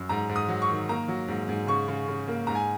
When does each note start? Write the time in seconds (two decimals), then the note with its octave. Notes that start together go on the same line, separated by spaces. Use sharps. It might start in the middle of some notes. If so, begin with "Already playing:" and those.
Already playing: F#2
0.09 G#2 A#5
0.29 G#2
0.36 D#6
0.48 F#3
0.62 C#6
0.70 D#3
0.89 A#3 A#5
1.08 F#3
1.28 G#2
1.49 G#2
1.67 C#3 C#6
1.88 C#3
2.08 C#3
2.28 A#3
2.47 G#2 A#5
2.55 G#5